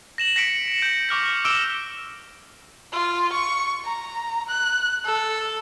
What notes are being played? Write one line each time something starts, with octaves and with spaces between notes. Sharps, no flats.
A#6 E7 F#7
A#6 B6 C#7 D7
D7 E7 F#7
G6 D7
C#6 D6 F6 A#6
D6 E6 D7 E7 G7
F4
C#6
A#5
F#6
A4